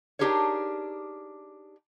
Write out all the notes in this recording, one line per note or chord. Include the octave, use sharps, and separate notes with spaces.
D4 D#4 G4 G#4 A#4 C#5